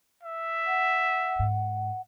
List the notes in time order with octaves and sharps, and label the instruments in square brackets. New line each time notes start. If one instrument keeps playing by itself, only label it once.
[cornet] E5
[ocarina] F#5
[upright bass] G#2